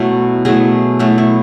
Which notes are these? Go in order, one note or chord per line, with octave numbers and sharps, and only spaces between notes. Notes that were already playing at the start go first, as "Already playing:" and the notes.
Already playing: B2 F#3 A3 E4
B2 F#3 A3 E4 G#4
B2 F#3 A3 E4
E4